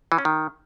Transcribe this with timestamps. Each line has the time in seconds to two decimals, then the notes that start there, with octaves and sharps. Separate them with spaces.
0.12 E3
0.18 C#4
0.25 D#3